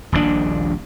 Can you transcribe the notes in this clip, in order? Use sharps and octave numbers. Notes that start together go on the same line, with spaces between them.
D#1 A#1 A#2 D4